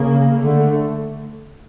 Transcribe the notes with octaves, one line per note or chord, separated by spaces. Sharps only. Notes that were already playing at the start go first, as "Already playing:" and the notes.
Already playing: C#3 A#3
D3 A3